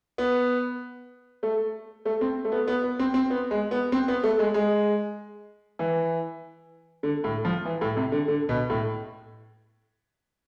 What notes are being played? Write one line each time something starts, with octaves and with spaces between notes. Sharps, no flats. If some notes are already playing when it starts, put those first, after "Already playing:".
B3
A3
A3
C4
A3
B3
B3
B3
C4
C4
B3
G#3
B3
C4
B3
A3
G#3
G#3
E3
D3
A2
F3
E3
A2
C3
D3
D3
B2
A2